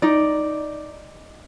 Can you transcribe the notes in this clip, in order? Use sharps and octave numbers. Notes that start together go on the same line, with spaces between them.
D#4 D5